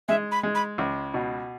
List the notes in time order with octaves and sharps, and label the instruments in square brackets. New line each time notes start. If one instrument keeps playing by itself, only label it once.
[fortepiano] G#3 [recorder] E5
[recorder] B5
[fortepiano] G#3
[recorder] B5
[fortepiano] C#2
B2